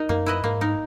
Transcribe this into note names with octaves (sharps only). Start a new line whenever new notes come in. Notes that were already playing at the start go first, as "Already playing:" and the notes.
Already playing: D#4 A#4 D#5
F#2 A#3
E4 B4 D#5
G#2 A#3
D#4 A#4